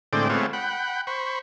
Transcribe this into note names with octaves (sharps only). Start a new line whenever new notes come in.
A2 D3 G#3 C4 D5 G5
G#3 A3 B3 C4 F4 C#5
F#5 G5 B5
C5 B5 C#6